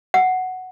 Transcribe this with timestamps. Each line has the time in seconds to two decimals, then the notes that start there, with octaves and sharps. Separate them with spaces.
0.14 F#5